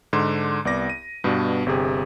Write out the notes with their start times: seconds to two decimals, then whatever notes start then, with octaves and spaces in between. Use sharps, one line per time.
0.13 G#2 D3 C6 D6 E7
0.65 C2 B3 D5 D6 A#6
0.90 D#7
1.24 G2 B2 B3 D4
1.66 G1 C3 G4 G#4